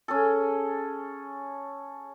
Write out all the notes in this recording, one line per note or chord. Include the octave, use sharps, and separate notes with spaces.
C#4 G#4 A4